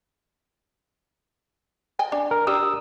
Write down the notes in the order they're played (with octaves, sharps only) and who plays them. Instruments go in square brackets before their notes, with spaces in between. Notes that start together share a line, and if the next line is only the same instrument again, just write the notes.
[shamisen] D#5 G5 G#5
D4
[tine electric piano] A#4
[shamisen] D4 G4 [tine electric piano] D#6 E6